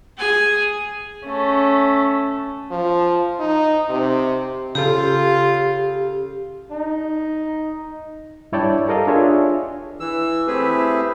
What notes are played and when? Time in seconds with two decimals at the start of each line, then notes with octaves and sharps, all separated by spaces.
0.18 G#4 G#5
1.26 A3 C#4
2.71 F3
3.39 D#4
3.89 C3
4.75 C#3 F4 G4 A4
6.72 D#4
8.52 G2 E4 C#5 D5 G5 A5
8.88 G4 A4 A#4 D#5 F5
9.07 D4 F4 G#4 C#5 E5
10.00 E3 E6
10.47 A3 C4 E4 G4 G#4 B4